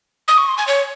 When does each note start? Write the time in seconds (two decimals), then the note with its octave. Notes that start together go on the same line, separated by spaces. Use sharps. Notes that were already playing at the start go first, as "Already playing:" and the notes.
0.28 D#6
0.38 C#6
0.48 C6
0.58 G#5
0.68 C#5